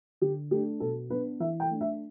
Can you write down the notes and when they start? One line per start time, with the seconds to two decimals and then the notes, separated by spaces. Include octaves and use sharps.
0.21 D3 G4
0.51 A3 D4 G4
0.80 B2 A4
1.10 B3 D4 B4
1.40 E3 E5
1.60 G5
1.70 A3 D4
1.81 E5